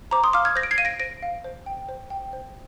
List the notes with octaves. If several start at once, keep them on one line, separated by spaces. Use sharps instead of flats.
C5 A#5 D6
C6 D#6
F5 D6 F6
F6 G#6
C5 G6 A#6
D7
G#6 C7
F5 D#7
A#6 D7
C5 A#6 D7
F5
C5
G5
C5
G5
C5